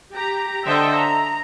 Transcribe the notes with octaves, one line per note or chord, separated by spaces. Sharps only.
G4 A#5
D3 A4 C5 D#5 E5 G5
A#5